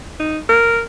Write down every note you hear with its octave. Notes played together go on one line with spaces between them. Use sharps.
D#4
A#4